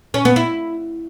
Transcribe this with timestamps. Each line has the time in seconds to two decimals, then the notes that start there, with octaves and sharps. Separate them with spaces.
0.14 C#4
0.25 B3
0.36 E4